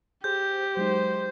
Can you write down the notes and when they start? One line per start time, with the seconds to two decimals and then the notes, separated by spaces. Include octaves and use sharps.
0.24 G4 G#4 C5 G6
0.77 F#3 G#3 D#4 C5